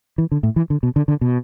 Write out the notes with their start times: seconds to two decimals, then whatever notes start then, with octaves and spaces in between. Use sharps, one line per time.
0.18 E3
0.32 D3
0.43 A2
0.56 E3
0.70 D3
0.83 B2
0.96 D3
1.08 D3
1.21 B2